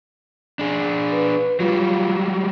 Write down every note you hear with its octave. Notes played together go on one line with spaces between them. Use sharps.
D4 G#4
B4
F#3 G3 F4